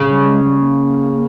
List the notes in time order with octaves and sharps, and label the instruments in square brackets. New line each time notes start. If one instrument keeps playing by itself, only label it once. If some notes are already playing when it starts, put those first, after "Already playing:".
Already playing: [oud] C#3
[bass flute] G3
G#3
G3
A#3